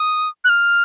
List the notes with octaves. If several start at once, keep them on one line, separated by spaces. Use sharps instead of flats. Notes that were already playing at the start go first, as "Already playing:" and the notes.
Already playing: D#6
F#6
F6